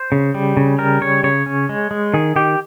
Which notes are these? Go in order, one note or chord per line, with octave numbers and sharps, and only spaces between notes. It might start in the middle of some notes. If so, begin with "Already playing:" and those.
Already playing: C5
C#3
G3
C#3
G3 A#4
C#3 C#5
C#3 C#5
C#4
G#3
G#3
D#3 G#4
D#3 G4